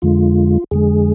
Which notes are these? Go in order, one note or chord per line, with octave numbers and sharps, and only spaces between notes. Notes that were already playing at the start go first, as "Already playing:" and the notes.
F2 D3 G#3 F4
F2 D3 G#3 G#4